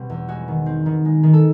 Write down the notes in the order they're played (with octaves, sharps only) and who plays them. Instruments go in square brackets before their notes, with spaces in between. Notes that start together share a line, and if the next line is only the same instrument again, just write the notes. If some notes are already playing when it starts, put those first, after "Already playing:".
Already playing: [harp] B2 G3 C4
E2
G#3 F#4
D#3
C4
D#3
G#3
D#3
A4